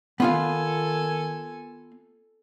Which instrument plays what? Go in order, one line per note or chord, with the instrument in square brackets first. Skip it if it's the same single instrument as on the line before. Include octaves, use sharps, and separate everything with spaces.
[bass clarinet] D#3 [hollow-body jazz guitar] B3 F4 F5 [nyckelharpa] A4 G#5